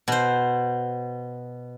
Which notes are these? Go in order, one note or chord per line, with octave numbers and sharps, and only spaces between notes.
B2 C5